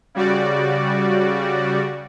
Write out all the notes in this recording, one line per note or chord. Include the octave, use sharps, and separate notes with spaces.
C#3 G3 F#4 D5